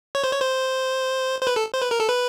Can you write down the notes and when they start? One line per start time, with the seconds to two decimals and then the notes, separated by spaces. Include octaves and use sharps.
0.15 C#5
0.24 C5
0.32 C#5
0.41 C5
1.42 C5
1.47 B4
1.56 A4
1.74 C5
1.82 B4
1.91 A#4
2.00 A4
2.08 B4